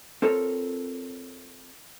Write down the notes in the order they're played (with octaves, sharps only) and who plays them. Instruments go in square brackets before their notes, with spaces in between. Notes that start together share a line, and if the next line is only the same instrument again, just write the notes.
[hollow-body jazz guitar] C4 F4 A4 A#4 C#5